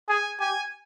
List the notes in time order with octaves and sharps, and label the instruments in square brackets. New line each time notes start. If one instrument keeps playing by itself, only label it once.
[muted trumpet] G#4 [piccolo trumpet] G#5
[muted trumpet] G4 [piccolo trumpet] G#5